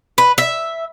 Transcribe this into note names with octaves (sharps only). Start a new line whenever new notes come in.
B4
E5